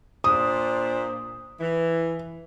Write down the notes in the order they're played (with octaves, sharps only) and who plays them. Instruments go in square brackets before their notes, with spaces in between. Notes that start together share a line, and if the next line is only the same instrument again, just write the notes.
[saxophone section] A#2 D4 C5 [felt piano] D#6
[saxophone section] E3